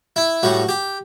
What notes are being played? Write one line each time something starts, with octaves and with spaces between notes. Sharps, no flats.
E4
A2 G3 F#4
G4